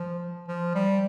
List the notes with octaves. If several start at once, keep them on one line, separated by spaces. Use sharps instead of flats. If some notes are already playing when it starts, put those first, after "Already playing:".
Already playing: F3
F3
G3